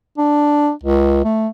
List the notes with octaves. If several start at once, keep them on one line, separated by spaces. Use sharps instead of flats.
D4
C#2
A3